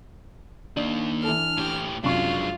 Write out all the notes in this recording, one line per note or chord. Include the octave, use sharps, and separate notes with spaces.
D#3 A#3 D4
E3 A4 F6
A2 G4
F#2 C3 G#3 D4 F4 C#6